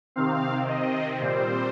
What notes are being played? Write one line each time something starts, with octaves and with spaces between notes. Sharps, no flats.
C3 D#3 C4 F5
D#5
A#2 G3 C4 C5